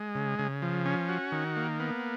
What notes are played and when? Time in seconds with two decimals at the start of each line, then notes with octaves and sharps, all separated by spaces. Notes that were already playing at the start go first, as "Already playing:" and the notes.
Already playing: G#3
0.15 C#3
0.39 C#3
0.62 F3
0.86 C#4
1.09 F#4
1.32 D#3
1.56 A#3
1.80 B3